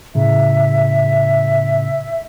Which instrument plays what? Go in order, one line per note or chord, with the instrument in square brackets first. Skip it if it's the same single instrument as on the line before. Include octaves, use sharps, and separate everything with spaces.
[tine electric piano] A2 C#3 [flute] E5